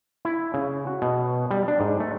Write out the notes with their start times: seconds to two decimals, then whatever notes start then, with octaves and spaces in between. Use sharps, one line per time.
0.25 E4
0.54 C#3
0.87 F#4
1.02 B2
1.51 G3
1.68 D4
1.80 G#2
2.00 A3